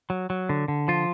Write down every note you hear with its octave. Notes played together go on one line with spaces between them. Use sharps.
F#3
F#3
D3
D3
F3 F4